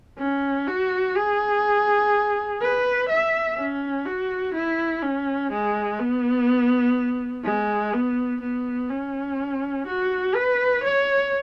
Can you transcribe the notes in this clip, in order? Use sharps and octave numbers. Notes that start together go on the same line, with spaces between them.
C#4
F#4
G#4
B4
E5
C#4
F#4
E4
C#4
G#3
B3
G#3
B3
B3
C#4
F#4
B4
C#5